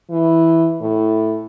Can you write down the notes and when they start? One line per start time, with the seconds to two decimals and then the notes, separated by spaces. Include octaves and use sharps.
0.10 E3
0.80 A2